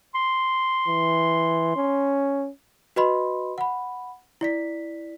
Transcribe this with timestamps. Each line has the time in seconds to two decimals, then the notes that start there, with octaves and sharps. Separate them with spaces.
0.15 C6
0.88 E3
1.76 C#4
2.96 F#4 B4 D#5 B5 C6
3.58 F#5 B5
4.41 E4 D5 B6